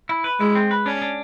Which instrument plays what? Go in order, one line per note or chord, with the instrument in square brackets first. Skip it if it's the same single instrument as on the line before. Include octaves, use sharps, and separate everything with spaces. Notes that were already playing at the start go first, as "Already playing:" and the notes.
[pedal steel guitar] E4
B4
[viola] G#3 [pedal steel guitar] E4
[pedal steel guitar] C4
B4
[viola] C#4 [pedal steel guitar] D4
[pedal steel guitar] D4